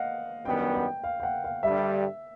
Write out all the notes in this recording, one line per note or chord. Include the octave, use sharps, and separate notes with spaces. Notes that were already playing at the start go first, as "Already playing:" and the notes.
Already playing: D#5 F5 F#5
F#2 D#3 G3 B3 D4 G5
G5
F5
G5
F#5
F5
G2 D3 G3 E5